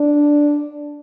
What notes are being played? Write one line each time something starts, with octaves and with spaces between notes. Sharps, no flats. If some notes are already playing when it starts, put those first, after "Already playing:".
Already playing: D4